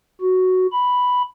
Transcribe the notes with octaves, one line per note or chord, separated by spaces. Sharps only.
F#4
B5